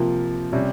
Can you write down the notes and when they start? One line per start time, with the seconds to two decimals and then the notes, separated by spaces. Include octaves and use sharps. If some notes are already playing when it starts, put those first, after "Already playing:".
Already playing: C3 F3 A#3 F4
0.52 C3 G3 C#4